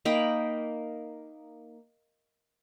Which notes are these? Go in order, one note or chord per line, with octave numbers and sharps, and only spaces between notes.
A#3 D#4 G5 B5